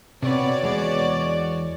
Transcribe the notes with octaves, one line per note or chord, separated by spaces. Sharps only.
C3 B3 F#4 C#5 D5
E2 G#3 B3